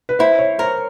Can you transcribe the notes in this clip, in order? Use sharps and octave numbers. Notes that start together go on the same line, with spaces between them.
B4
E4 C5
C#5
A#4 C5